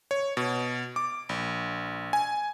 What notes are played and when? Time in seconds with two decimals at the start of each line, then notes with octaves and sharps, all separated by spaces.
0.11 C#5
0.37 B2
0.96 D6
1.29 A#1
2.13 G#5